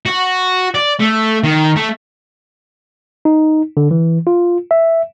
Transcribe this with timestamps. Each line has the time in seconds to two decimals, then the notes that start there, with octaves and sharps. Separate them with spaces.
0.06 F#4
0.74 D5
1.00 A3
1.44 D#3
1.76 A3
3.25 D#4
3.77 D3
3.91 E3
4.27 F4
4.71 E5